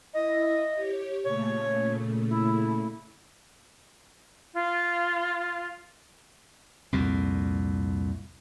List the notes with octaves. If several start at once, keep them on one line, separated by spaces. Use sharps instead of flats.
E4 D#5 E5
G4 C#5
A#2 C#3 A3 C#5
E4
F4
C2 F2 A#2